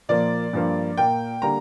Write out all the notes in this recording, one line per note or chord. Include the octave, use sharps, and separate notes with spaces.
A#2 F3 A#3 D5
G2 F3 A#3
A#2 A#3 G5
D3 G3 A#3 A#5